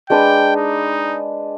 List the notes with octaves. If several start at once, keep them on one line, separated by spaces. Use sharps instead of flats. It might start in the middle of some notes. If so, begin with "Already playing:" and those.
G#3 D4 B4 G5
D#4